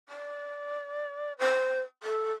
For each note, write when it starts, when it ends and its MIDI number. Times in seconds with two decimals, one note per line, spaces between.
0.08 1.32 74
1.38 1.80 72
2.03 2.31 69